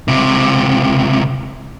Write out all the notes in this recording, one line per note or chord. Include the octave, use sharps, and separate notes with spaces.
C#2 C3